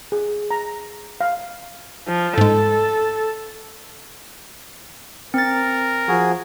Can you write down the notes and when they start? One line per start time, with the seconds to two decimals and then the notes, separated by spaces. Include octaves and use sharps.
0.12 G#4
0.51 A#5
1.21 F5
2.07 F3
2.38 G#2 G#3 A4
5.34 C4 A#4 A6
6.08 F3 F#4 G#4